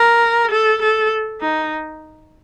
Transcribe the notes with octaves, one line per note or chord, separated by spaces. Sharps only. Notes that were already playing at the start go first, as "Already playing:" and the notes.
Already playing: A#4
A4
A4
D#4